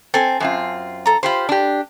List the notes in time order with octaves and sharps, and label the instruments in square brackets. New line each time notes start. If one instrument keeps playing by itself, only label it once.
[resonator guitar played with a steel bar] C4 [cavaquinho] A4 G#5
[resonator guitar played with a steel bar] F#2 C4 F4
[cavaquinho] A4 A#5
[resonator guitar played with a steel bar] F4 G4 C5 [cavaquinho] B5 C6
[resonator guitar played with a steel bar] D4 G4